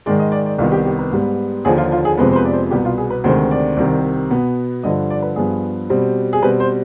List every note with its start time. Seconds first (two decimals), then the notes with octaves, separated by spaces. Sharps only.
0.06 G#2 D#3 G#3 D5
0.20 D#5
0.32 D5
0.46 D5
0.58 C2 C3 D#3 B3 F4
0.72 G4
0.86 G4
0.99 B4
1.12 G#2 G3 B3
1.65 D#2 D3 F3 G#4
1.78 F4
1.92 F4
2.05 G#4
2.18 F2 C3 F3 G#3 B3 B4
2.32 C5
2.36 B4
2.45 D5
2.53 C5
2.71 C2 B2 B3 G4
2.85 F4
2.98 G#4
3.10 B4
3.24 D2 C3 D#3 G#3 C4 C5
3.51 D5
3.77 C2 C3 D#3
4.30 B2 B3
4.83 G2 D3 F3 D#5
5.10 D5
5.22 B4
5.36 G2 F3 B3 G#4
5.89 B2 G3 C4
6.33 G#4
6.42 B2 G3 C4 B4
6.60 C5